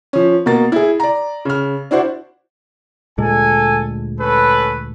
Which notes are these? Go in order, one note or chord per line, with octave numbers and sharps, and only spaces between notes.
F3 C#4
B2 A#3 A6
E4 G#4
D5 A#5
C#3 F6
D4 E4 F#4 C5
D2 A#2 G#3 A4 G#5
C#4 A4 B4